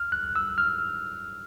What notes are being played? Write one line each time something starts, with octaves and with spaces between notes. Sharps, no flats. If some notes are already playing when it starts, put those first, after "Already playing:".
Already playing: F6
F#6
E6
F6